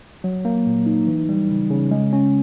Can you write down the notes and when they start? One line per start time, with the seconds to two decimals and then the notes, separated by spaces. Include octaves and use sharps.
0.24 F#3
0.45 A#3
0.66 A#2
0.86 D#4
1.07 E3
1.29 G3
1.50 C#3
1.70 C#3
1.91 G#3
2.13 C#4